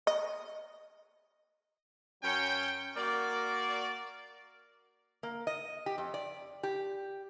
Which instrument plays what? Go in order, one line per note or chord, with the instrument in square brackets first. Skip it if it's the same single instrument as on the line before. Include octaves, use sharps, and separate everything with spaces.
[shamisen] D#5
[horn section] F#2 F#3 C#4 C#5 G5
A#3 F#4 A#4 D5
[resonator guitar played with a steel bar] A#3
D#5
G4
F2
D5
G4